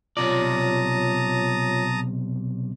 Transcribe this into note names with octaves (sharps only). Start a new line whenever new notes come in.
B1 C3 F4 C#5 D5 A5 A#5 D#6